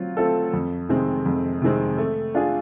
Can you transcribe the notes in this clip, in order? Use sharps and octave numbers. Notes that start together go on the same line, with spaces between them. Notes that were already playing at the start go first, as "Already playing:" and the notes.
Already playing: F#3 C4 F4
A3 C4 F4 A4
F2
C3 D#3 G#3 C4
F2
C3 D#3 G#3 C4
A3
D4 F4 G#4